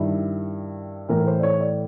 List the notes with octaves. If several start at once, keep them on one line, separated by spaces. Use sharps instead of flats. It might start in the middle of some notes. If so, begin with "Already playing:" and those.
Already playing: G2 D#3 E4
A2 E3 A#4
C5
D5
C#5
D5